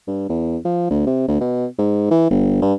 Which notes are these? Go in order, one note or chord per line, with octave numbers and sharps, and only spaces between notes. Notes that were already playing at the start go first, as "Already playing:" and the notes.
G2
E2
F3
D2
C3
D2
B2
G#2
E3
G1
G2